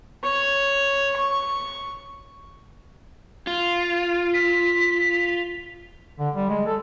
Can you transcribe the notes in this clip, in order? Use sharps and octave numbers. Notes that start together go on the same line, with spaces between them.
C#5
C#6
F4
B6
D3
G3
G#3
A4